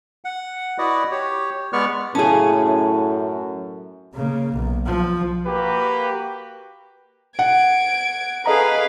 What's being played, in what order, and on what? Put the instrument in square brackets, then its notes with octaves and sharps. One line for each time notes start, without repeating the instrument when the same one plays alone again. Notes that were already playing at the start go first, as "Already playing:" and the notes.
[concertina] F#5
E4 F#4 B4 D5 D#5
G4 C#5
G#3 B3 B4 D5 C#6 F6
[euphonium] F#2 [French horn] A2 [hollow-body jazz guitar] C#4 G#4 [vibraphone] A5
[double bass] C#3 A#3
B1
F3
[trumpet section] A#3 F#4 G4 B4
[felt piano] F#5 [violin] G#6 D7
[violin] C#4 F5 [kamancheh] G#4 B4 [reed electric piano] A4 D#5 A#5